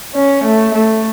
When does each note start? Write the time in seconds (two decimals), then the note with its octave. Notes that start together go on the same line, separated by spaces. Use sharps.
0.15 C#4
0.44 A3
0.74 A3